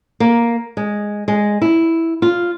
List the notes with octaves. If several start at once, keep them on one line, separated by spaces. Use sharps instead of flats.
A#3
G#3
G#3
E4
F4